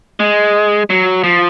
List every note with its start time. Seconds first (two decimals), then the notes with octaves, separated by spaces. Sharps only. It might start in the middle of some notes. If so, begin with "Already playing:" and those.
0.20 G#3
0.90 F#3
1.24 F3